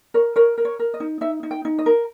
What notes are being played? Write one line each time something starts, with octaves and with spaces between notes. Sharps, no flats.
A#4 C#5
A#4 C#5
A#4
C#5
A#4
D#5
D#4
D#4 E5
D#4
G5
D#4
D#5
A#4